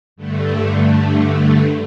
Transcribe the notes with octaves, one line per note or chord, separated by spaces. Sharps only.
G2 D3 A3